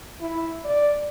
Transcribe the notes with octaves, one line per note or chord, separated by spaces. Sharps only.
E4
D5